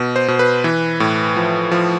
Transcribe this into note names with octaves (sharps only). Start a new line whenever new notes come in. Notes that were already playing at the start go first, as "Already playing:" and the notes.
Already playing: B2
C5
B2
B4
E3
A2
F3
F3